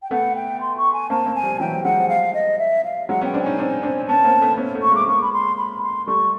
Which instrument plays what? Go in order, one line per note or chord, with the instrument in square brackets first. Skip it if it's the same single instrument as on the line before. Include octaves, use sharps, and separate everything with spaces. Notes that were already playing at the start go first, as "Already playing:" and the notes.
[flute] G5
[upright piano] A3 B3 [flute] F#5
[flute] G5
C6
C#6
G#5
[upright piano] A#3 C4 [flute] A5
[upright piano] A#3 C4
[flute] G#5
[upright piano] F3 G3
[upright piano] E3 F#3 [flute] G5
[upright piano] F3 G3
[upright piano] F#3 G#3 [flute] F#5
[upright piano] F3 G3
[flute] F5
D#5
E5
F5
[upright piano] F#3 G#3 [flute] F#5
[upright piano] B3 C#4 [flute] G5
[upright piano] C4 D4
[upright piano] C#4 D#4 [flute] G#5
[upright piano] C4 D4
C4 D4
[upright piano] B3 C#4 [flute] A5
[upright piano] A#3 C4
A3 B3
B3 C#4
A3 B3
[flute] C#6
[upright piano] G#3 A#3 [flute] D6
[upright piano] G#3 A#3 [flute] C#6
[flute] B5
C6
B5
C6
[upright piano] G3 A3 [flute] C#6